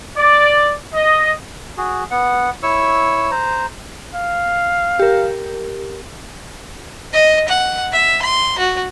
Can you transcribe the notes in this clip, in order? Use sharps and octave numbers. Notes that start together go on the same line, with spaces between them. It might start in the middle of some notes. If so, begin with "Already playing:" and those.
D5
D#5
F#4 G#4
B3 F#5
E4 C#5 C#6 E6
C5 A#5
F5
G4 A#4
D#5
F#5
E5
C6
F#4